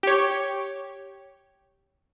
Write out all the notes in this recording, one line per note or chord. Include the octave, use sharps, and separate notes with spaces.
G4 C#5